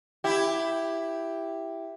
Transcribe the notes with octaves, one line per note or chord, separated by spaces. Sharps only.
E4 G4